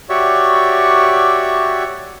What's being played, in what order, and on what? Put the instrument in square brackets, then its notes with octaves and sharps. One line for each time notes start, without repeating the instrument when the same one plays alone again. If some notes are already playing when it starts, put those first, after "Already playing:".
[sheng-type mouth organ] F#4 G4 C#5 D5 E5 C#6